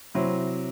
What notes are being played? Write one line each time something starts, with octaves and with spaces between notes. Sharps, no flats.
C3 F#3 C4 E4